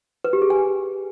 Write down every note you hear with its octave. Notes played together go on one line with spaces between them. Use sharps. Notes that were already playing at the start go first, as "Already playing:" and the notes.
B4
G4
G#4
G#5